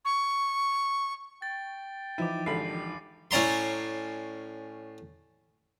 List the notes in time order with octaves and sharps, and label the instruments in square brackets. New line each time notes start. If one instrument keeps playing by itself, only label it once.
[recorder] C#6
[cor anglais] G5 [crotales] A6
[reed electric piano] E3 F3 D#4 [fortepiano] E4 [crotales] D6 D#7
[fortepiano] G#1 D3 B5 [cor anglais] G4 [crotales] C7
[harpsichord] A2 C#4 D5 A#5 C6